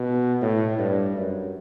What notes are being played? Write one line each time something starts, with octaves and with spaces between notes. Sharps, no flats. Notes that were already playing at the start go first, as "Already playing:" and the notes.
Already playing: B2
A2
G2
F#2